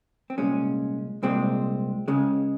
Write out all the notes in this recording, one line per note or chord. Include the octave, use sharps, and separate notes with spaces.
C4
C2 A#2 G#3 C#4
C2 A#2 G#3 C4
C#2 C#3 G#3